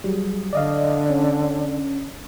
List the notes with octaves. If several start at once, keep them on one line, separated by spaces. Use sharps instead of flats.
F#3 G3 G#4
D3 D5 D#5 F5
C#4